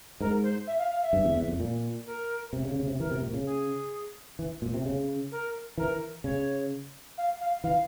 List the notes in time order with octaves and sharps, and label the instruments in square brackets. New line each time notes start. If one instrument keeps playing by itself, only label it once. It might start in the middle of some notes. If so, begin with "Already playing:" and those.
[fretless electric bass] G#2 [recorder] A#4
[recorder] C5
E5
F5
F5
E5
[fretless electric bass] G2
E2
E2
F2
A#2
[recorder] A#4
[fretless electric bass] C3
C#3
C#3
C3
[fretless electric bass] E3 [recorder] A#4
[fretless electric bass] C3
A#2
C#3
[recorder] G#4
[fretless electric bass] E3
A#2
C3
C#3
[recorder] A#4
[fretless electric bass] E3 [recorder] A#4
[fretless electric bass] C#3 [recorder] C#5
[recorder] F5
F5
[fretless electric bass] E3 [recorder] F5